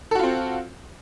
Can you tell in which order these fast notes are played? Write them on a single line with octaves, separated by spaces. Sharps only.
A4 F#4 F4 C4